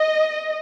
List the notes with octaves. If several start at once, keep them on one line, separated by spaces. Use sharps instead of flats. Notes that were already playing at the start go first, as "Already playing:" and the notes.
Already playing: D#5